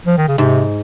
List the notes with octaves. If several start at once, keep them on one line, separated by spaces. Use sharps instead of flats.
F3
D#3
C#3
G#2 C3